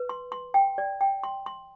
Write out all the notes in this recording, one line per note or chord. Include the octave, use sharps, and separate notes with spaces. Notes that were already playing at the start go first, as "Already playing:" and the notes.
Already playing: B4
C6
C6
G5
D5
G5
C6
C6